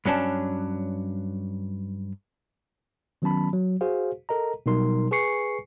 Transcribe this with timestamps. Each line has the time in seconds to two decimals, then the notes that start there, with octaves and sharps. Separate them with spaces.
0.05 G2 F#3 C#4 D4 A5
3.22 D#3 F#3 B3 C#4 A5 B5
3.53 F#3
3.81 F#4 G#4 C5 F5
4.29 A4 A#4 D#5 A#5
4.66 B2 F#3 G3 D#4 A#4 C6
5.11 G#4 B4 G#5 C#6 C7 C#7